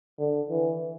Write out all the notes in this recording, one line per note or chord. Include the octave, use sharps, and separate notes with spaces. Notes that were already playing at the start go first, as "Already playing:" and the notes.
D3
E3